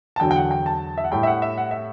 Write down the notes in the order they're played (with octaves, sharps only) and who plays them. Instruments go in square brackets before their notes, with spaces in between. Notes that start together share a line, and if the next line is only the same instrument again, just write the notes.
[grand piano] A5
E2 D3 F#3 G5
G5
F#5
G5
A5
E5
F#5
A2 G3 G5
E5
F#5
E5
F#5
E5